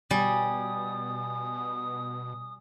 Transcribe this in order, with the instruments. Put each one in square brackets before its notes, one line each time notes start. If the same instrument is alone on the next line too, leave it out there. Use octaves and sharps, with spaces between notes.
[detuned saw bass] B2 [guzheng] G3 [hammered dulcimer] G#5 [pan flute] D#6